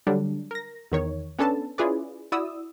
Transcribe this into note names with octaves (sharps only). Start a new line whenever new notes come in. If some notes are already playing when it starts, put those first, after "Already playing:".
D3 F#3 G3 D4
A#4 A#6
E2 D#3 C#5
B3 C#4 D4 A4 B4 A5
C#4 E4 F4 G#4 B4 D5
E4 F#4 D5 D#6 E6